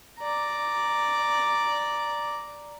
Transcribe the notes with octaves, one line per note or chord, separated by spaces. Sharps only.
D5 A#5